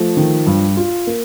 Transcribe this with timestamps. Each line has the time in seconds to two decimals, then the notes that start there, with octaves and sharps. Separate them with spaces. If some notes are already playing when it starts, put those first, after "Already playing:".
Already playing: F3 A3
0.17 D#3
0.47 G2
0.77 F4
1.07 A#3